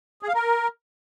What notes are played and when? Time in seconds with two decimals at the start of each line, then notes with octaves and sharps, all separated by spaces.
0.23 G#4
0.28 F5
0.34 A#4